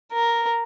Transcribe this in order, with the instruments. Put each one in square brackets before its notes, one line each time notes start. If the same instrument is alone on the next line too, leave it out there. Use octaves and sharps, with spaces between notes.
[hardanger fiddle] A#4